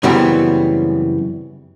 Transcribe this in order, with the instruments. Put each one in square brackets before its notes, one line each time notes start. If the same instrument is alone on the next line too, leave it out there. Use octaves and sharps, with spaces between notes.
[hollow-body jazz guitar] F#2 C#3 E3 G3 B3 C4